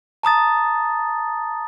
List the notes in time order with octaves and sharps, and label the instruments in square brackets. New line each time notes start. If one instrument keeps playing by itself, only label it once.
[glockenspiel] A5 A#5 D#6 A6